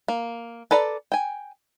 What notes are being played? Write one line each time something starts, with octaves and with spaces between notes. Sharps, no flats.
A#3
A4 B4 D5 A#5
G5 G#5